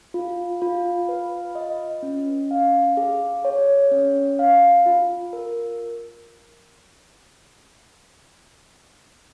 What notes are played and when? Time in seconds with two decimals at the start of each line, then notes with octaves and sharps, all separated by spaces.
0.14 F4
0.62 F4
1.09 B4
1.55 D#5
2.03 C#4
2.51 F5
2.97 G#4
3.45 C#5
3.91 C#4
4.39 F5
4.86 F4
5.33 A#4